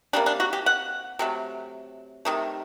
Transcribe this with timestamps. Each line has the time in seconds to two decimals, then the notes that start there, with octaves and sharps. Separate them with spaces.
0.13 C3 G3 A#3 D4
0.26 D4
0.40 F#4
0.53 G4
0.66 F#5
1.19 C3 F#3 A3
2.25 C3 D#3 A3